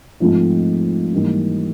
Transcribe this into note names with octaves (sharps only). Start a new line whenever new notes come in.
G#2 F3 A3 C4 F4
G#2 E3 G3 A#3 D#4